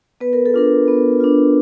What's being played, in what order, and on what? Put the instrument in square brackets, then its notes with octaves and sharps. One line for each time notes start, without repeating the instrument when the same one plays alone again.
[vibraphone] B3 B4
A#4
A4
D4 F4 A#4
B3
D4 F4